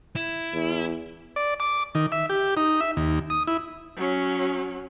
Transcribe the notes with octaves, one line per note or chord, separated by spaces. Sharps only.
E4
E2
D5
D6
D#3
E5
G4
D#4
E5
D#2
D#6
E4
F#3 C#4